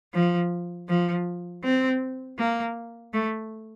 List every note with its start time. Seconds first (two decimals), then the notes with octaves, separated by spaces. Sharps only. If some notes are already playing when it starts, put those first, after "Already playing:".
0.14 F3
0.88 F3
1.64 C4
2.39 A#3
3.13 A3